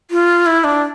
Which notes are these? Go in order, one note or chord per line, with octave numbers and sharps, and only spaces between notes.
F4
E4
D4